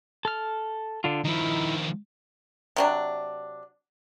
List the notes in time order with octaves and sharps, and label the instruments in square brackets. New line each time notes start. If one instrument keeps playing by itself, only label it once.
[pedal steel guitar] A4 F6
D3 D4 F4
[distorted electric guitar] D#3 F3 [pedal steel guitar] D#4 E4
[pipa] C3 F#3 D4